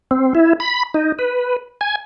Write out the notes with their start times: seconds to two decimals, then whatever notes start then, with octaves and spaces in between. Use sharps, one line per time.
0.11 C4
0.35 E4
0.60 B5
0.94 D#4
1.19 B4
1.81 G#5